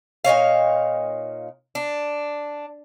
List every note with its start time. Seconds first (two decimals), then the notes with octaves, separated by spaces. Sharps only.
0.24 A#2 D#4 C#5 F5
1.75 D4